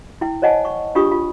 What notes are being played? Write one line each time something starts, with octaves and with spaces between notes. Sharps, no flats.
E4 G5
C5 C#5 D#5 F#5 G#5 A5
C#6
D4 F4 G4 G#4 C#6 D#6
F4